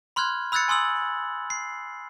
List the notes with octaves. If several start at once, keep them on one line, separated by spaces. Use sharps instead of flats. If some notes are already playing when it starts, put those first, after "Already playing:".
B5 C6 F6 F#6 G#6
B5 E6 F#6 G#6 A6 C#7
G#5 C6 D#6 E6 F#7
C7